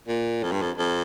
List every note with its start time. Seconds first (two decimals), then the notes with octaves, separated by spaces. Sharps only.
0.08 A#2
0.43 F2
0.52 G2
0.61 F2
0.78 F2